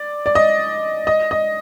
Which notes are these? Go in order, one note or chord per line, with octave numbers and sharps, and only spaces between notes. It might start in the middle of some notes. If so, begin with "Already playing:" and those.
Already playing: D5
D5
D#5
D#5
D#5